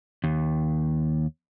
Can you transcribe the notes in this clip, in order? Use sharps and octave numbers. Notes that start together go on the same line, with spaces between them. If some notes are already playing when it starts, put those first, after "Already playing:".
D#2